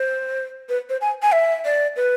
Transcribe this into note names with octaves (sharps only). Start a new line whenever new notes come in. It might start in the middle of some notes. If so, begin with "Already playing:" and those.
Already playing: C5
B4
C5
G#5
G#5
E5
D5
B4